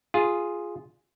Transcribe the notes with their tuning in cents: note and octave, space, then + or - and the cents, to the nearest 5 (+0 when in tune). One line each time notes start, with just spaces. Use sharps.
F4 +0 G#4 +0